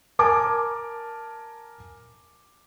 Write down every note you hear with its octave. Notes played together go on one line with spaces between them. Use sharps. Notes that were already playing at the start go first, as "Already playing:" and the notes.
A#4 G#5 A5 D6